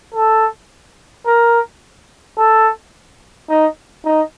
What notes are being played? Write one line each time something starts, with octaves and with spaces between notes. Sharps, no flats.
A4
A#4
A4
D#4
D#4